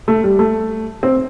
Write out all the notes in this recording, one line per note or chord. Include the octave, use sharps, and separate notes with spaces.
A3
G3
A3
C4